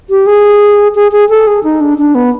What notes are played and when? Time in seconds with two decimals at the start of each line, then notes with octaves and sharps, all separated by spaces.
0.10 G4
0.27 G#4
0.95 G#4
1.12 G#4
1.29 A4
1.47 G#4
1.64 D#4
1.81 D4
1.98 D4
2.15 B3